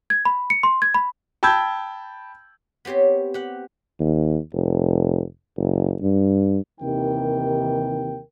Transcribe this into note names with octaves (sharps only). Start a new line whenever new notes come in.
G#6
B5
C#7
C6
G#6
B5
G5 A5 B5 E6 G6 G#6
B3 C4 G4 C5 C#5
G4 F#5
D#2
F1
F#1
G2
D#2 C3 D#3 E3 A#4 G5